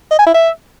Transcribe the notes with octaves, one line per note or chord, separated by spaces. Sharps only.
D#5
G#5
E4
E5